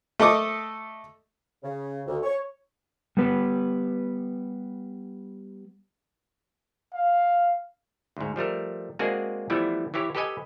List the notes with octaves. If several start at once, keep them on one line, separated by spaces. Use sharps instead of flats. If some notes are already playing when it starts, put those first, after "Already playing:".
A3 A4 D#5 D6 D#6
C#3
D2
C#5
G3 B3 B4
F5
D2 G#2
F3 G3 A3 A#4
G#3 A#3 C4 D4 F#4 G#4
E3 F3 G3 A3 B3 E4
E3 E4 G4 C#5
G4 A4 B4 D#5 G#5